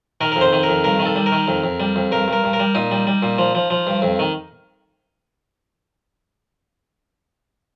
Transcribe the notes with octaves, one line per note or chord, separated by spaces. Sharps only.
D#3 A#4
F2 A#4
C5
D#3
A#4
F2
G2 A#4
D#3
A4
G3
A#4
D#3
F2
F2
G3
F2
G2 A#4
G2 A#4
G2
A#4
G3
A#2 D#4
G3
G3
A#2
F3
F3
F3
G2
F2
D#3